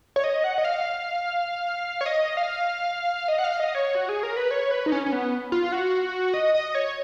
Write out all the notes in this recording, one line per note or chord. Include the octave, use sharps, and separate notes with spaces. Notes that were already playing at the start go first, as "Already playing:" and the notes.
C#5
D#5
F#5
D#5
F5
C#5
D#5
F5
D#5
F#5
F5
D#5
C#5
F#4
G#4
A#4
B4
C#5
B4
D#4
C#4
C#4
B3
F4
F#4
D#5
D#5
C#5